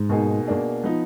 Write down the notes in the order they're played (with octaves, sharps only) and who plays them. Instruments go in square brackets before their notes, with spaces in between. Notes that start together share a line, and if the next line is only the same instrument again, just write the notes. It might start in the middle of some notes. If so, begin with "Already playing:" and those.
Already playing: [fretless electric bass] G#2
[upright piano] B2 A#3 D#4 G#4
B2 A#3 D4 G#4
F3 B3 D#4